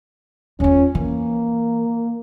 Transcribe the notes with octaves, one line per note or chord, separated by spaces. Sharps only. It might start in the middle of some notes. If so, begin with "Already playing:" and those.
E2 C#4 F4
E3 A#3